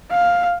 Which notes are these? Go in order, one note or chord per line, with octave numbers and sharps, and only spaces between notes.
F5